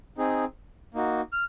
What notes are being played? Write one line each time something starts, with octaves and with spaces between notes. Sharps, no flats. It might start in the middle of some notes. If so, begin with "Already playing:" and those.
C4 D#4 G#4
A#3 D#4 F#4
F6